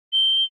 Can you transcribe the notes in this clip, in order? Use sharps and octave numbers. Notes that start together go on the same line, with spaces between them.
G7